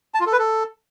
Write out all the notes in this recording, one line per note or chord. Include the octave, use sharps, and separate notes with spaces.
A5
F4
A4
B4
A4